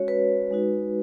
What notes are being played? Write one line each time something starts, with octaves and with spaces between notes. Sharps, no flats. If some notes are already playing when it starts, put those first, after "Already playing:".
Already playing: G#3 C#4 F#4 C#5
B4
G#3 D#4 F#4